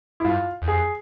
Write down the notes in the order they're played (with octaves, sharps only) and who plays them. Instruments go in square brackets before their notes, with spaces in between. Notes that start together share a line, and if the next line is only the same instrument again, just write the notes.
[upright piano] E4
[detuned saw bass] G2 [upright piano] F4
[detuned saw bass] E2
[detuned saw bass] F2 [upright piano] G#4